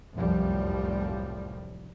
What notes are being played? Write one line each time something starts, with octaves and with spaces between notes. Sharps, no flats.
F1 C2 F#2 A2 F3 G3